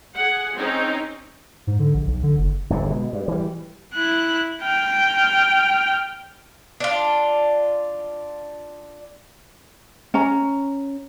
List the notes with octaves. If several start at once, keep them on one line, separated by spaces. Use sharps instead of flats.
G#4 F#5
C4 C#4 D#4
G#2
D3
A#1
B1
D3
F#1
G1 G#2 C3
B2 G#3
G2
E3 G3
E4 F#6
G5 F6
D4 F4
C#4 A#5